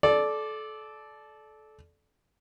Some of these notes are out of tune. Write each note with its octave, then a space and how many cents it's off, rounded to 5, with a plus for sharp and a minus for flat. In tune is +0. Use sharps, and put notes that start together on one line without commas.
A4 -25 D5 +0